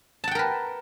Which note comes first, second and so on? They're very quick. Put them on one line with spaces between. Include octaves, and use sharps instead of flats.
A5 F#5 G5 A#4 B4